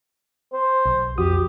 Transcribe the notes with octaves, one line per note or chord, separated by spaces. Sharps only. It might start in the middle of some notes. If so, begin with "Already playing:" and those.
C5
B1
F2 F#4 G4 D#6